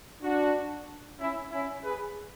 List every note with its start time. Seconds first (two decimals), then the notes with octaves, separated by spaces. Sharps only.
0.23 D4 F#4
1.20 C#4 E4
1.52 C#4 E4
1.85 G#4 B4